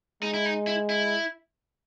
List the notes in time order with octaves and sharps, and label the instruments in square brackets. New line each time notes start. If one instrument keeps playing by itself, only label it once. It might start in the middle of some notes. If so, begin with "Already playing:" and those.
[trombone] G#3 [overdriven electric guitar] D#4
[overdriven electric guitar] E4
D#4
E4
E4